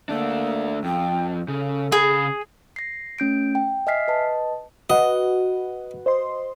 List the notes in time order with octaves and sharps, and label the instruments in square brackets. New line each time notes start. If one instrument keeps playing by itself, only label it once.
[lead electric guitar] A3 D4 [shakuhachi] A#3
[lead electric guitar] F2 [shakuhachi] G5
[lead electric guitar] C#3 [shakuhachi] A4
[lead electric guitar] C#3 B5 [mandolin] G#4
[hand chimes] A#6 C7
A3 C#4 G6 D7
G5
D#5 E5 G#5 F6 B6 C7
B4 D#5 A5
[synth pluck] F#4 B4 F#5 [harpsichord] D#5
[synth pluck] C5 D#5 C6